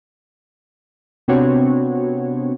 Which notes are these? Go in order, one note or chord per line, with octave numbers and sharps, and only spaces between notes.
C3 B3 C4 D4 F#4 C#5